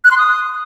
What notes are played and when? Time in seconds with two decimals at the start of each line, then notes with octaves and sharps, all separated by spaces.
0.04 F#6
0.11 C6
0.18 D#6